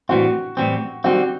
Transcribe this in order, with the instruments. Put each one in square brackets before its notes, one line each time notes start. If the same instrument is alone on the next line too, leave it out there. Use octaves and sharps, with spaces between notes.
[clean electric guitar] A2 E3 G3 C4 [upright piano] F#4
[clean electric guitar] A2 E3 G3 C4
[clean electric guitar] D#3 G3 C4 [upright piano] F#4